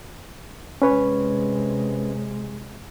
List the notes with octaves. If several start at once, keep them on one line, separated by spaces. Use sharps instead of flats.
C3 G#3 C#4 B4 C#5